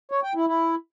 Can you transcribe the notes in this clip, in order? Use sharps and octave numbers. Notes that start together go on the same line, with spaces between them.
C#5
G5
E4
E4